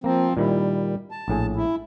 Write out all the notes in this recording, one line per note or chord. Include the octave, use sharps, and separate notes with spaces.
F3 A#3 C4 A#5
A#2 D#3 G3 E4
A5
A#1 A2 G#4
E4